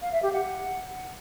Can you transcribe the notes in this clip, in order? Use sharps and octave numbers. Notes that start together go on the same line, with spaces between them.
F5
E5
G4
F#5